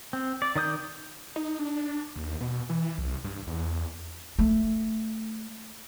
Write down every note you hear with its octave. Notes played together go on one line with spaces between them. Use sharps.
C4
D5
D#3 D5 D#6 G6
D#4
D4
D#2
B2
E3
C2
G2
E2
A3